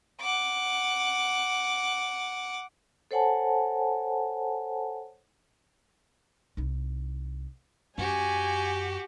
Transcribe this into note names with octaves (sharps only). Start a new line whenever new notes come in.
F#5 D6
A4 C5 C#5 F#5 G#5 A5
C2 D#4
F#2 F#4 G4 G#5